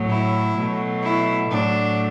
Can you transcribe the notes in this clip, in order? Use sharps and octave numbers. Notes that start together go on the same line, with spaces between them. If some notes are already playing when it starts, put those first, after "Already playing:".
Already playing: A2 F#3 A3
E4
B2 F#3 A3
E4
A2 F#3 A3 D4